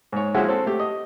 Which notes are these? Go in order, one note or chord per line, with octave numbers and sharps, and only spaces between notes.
G#2 C#5
F3 F#3 G#3 C#4 E4 F#4
C4 A4
A3 G4
D#5